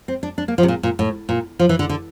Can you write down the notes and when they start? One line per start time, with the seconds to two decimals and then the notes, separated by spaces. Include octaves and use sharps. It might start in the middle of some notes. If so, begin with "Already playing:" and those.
0.08 C4
0.23 D4
0.38 D4
0.48 A#3
0.58 F3
0.63 C3
0.68 A#2
0.83 A#2
0.99 A2
1.29 A#2
1.59 F3
1.69 E3
1.79 D3
1.89 D3